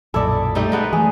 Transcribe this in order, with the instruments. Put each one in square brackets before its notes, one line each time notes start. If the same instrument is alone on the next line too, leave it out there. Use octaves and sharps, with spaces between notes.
[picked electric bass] B1 F#2 A#2 [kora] E4 [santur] A4 D5 D#5
[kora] G3 A3 D#4
G#3 B3 B4
[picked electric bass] E3 A3 [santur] G#4